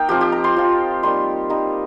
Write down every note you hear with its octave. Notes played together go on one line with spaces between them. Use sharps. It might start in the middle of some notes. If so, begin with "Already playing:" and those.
Already playing: A#3 D#4 G5 A#5
F3 C4 F4 G4
G4
A#5
C6
F3 C4 F4
G3 A#3 D#4 C6
G3 A#3 D#4